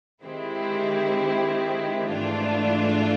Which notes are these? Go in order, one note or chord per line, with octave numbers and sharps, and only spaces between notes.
D#3 G#3 C4 E4 G4
G#2 E3 A3 D4 F4